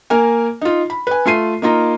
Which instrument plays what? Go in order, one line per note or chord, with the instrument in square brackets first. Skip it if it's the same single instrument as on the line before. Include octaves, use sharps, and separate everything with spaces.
[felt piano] A#3 A#4 G#5
D#4 F4
B5
B4 G#5
A3 F4 C7 D#7
A#3 D#4 F4 A#5